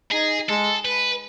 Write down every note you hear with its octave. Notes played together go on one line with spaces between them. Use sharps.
D#4 G#4
G#3 A4
B4